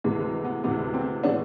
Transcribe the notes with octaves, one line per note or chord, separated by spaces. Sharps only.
D2 C3 E3 G#3
B3
D2 C3 E3 G#3 B3
C4
A2 E3 G#3 B3 D4